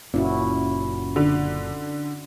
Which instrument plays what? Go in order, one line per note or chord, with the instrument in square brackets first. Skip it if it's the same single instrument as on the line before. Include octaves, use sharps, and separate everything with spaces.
[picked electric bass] F#1 A#2 [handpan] C#4 E4 F#4
[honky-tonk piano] D3